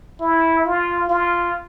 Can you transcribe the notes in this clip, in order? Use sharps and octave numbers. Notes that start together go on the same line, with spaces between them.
E4
F4
F4